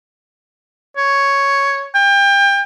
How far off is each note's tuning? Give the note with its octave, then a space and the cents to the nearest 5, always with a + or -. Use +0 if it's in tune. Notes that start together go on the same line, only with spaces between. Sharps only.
C#5 +0
G5 +30